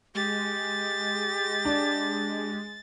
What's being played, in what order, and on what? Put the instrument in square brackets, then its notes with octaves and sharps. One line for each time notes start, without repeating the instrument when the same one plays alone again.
[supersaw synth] G#3 [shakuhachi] G4 [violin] A6
[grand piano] D4